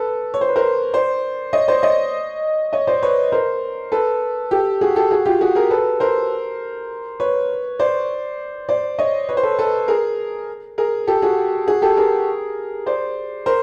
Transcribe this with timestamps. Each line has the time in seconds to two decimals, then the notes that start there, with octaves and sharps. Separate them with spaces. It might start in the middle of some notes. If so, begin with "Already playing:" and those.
Already playing: A4 B4
0.34 C#5
0.41 C5
0.49 B4
0.56 A#4 C5
0.93 C5 D5
1.53 C#5 D#5
1.68 C5 D5
1.82 C#5 D#5
2.73 C#5 D#5
2.87 C5 D5
3.02 B4 C#5
3.32 A#4 C5
3.92 A4 B4
4.51 G4 A4
4.81 F#4 G#4
4.96 G4 A4
5.11 F#4 G#4
5.26 F4 G4
5.41 F#4 G#4
5.55 G#4 A#4
5.71 A4 B4
6.00 A#4 C5
7.20 B4 C#5
7.79 C5 D5
8.69 C5 D5
8.99 C#5 D#5
9.29 B4 C#5
9.37 C5
9.43 A4 B4
9.59 A4 B4
9.88 G#4 A#4
10.78 G#4 A#4
11.07 G4 A4
11.22 F#4 G#4
11.67 F#4 G#4
11.82 G4 A4
11.97 G#4 A#4
12.86 C5 D5
13.46 A#4 C5